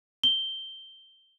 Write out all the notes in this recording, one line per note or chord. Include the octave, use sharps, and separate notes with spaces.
G7